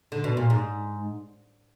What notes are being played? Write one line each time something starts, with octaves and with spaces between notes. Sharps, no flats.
D3
B2
A#2
G#2